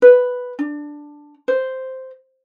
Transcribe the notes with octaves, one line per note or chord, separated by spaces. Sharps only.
B4
D4
C5